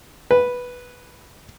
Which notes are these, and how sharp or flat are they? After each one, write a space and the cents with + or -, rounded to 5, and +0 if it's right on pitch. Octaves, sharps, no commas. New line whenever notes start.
B4 -5